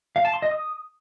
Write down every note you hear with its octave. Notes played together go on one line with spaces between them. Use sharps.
F5
A5
C6
D#5
D#6